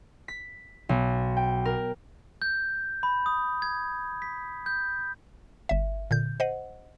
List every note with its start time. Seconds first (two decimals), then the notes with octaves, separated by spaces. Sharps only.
0.28 B6
0.89 B1
1.37 G5
1.65 A#4
2.42 G6
3.03 B5
3.26 D#6
3.62 G#6
4.22 B6
4.66 G6
5.69 G1 E5
6.11 A#2 D3 G6
6.40 C5 D#5 F#5